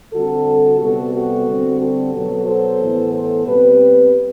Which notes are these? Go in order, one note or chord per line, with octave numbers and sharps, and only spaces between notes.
D3 G3 C4 F#4 A4
C3 G3 B3 F#4 A4
F#4 A4
D3 G3 C4
F#4 A4
B2 F#3 B3
A4 C5
A2 E3 B3
A4 C5
B2 G3 C4 G4 B4